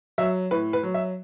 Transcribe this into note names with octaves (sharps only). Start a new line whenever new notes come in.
F#3 E5
A2 B4
B4
F#3
E5